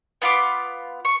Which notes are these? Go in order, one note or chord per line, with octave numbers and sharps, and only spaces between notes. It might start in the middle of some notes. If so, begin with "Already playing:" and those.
B3 F4 B5 D6
C#6